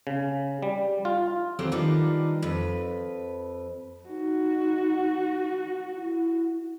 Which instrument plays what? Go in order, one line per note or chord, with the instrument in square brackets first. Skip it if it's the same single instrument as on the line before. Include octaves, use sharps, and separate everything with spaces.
[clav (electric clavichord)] C#3
G3
F4
[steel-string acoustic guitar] F#3 C4 E4 G4 A4 F5
D#3 G3 D4 D#4 F4 B4
F2 B4
[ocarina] D#4 [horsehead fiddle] F#4
[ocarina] E4